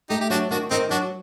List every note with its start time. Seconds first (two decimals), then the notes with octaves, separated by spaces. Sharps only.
0.10 A3 D#4 G4
0.21 G4
0.30 F#3 D4 F#4
0.51 D#3 D4 F#4
0.71 D#3 C4 D#4
0.91 F#3 D4 F#4